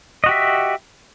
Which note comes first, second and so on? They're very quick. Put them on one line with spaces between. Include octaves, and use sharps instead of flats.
D#5 F#4 G4 E5